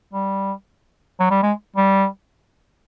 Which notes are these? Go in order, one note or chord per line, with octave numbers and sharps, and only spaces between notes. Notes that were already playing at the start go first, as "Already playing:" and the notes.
G3
F#3
G3
G#3
G3